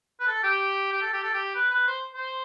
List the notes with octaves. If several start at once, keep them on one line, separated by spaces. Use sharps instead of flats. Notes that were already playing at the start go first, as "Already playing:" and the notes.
B4
A4
G4
G4
A4
G4
A4
G4
B4
B4
C5
C5